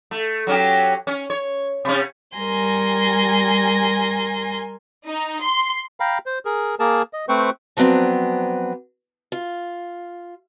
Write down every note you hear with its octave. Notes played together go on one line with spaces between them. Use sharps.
A3
F#3 C#4 G4
C#4
C#5
C3 C#4
G3 A#4 G#5 C6 A#6
D#4
C6
F5 G5 A#5 B5
C5
G#4 A#4
A#3 G#4 A#4 A5
D#5
A3 C4 B4 C5 G5 C#6
F3 F#3 B3 C4 D4
F4